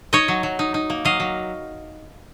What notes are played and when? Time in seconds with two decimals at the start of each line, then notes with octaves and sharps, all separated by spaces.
0.13 D#4 C#5 D#5
0.28 F#3
0.43 F#3
0.59 D#4
0.74 D#4
0.90 A#3
1.05 F#3 D#5 F5
1.20 F#3